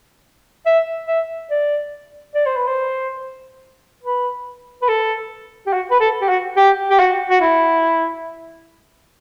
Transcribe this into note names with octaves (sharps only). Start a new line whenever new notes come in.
E5
E5
D5
D5
C5
B4
C5
B4
B4
A4
G4
F#4
B4
A4
G4
F#4
G4
G4
F#4
F#4
E4